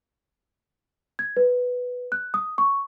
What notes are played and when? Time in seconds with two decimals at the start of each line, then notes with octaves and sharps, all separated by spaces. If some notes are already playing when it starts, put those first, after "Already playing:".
1.19 G#6
1.37 B4
2.12 F#6
2.34 D#6
2.58 C#6